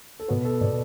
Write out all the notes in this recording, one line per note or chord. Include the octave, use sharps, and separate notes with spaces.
A4
B2 B3 F#4
A4
B2 B3 D5